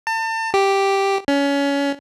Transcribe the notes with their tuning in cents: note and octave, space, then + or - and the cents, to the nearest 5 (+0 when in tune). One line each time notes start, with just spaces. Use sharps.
A5 +35
G4 +0
C#4 +25